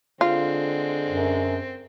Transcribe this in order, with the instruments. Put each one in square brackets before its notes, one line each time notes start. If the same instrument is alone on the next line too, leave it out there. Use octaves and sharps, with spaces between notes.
[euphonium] D3 [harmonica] G#3 C4 [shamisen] F4
[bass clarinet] F#2